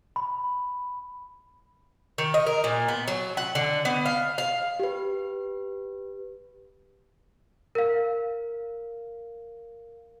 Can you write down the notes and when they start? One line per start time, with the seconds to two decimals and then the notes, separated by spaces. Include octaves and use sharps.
0.16 B5
2.18 D#3
2.34 D#5
2.46 A#4
2.64 A#2
2.88 B3
3.08 F#3
3.37 F#5
3.55 D3
3.85 B3
4.06 F5
4.38 F5
4.80 G4 B4
7.75 A#4 F5